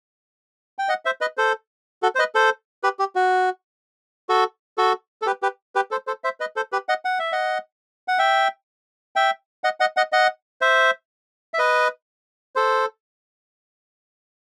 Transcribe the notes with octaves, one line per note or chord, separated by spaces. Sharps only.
G5
D#5 F#5
C5 E5
B4 D#5
A4 C5
F#4 A4
C5
B4 D#5
A4 C5
G4 B4
G4
F#4
F#4 A4
F#4 A4
A4
G4 B4
G4 B4
G4 B4
A4 C5
A4 C5
C5 E5
B4 D#5
A4 C5
G4 B4
D#5 F#5
F#5
E5
D#5 F#5
F#5
E5 G5
E5 G5
D#5 F#5
D#5 F#5
D#5 F#5
D#5 F#5
C5 E5
E5
B4 D#5
A4 C5